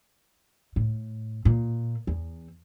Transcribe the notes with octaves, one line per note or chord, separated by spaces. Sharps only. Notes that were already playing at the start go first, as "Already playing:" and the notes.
A2
A#2
E2